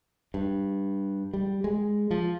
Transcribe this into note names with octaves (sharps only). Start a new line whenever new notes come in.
G2
G3
G#3
F3